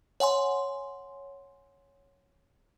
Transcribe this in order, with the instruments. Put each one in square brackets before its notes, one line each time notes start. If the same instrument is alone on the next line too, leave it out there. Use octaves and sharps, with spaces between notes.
[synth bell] C#5 F#5 G#5 C6